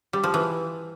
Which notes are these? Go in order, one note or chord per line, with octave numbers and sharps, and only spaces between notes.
G3
F3
E3